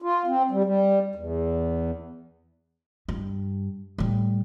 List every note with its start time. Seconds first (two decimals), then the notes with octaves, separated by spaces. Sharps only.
0.02 F4
0.27 C4
0.51 G3
0.64 G3
1.16 E2
3.09 G2
3.98 A2 G3